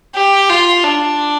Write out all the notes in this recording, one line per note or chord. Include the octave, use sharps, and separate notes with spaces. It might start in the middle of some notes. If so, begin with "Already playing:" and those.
G4
F4
D4